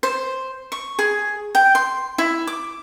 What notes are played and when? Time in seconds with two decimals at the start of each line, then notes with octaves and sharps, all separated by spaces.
0.03 C5
0.72 C#6
0.99 G#4
1.55 G5
1.75 C6
2.18 E4
2.47 D6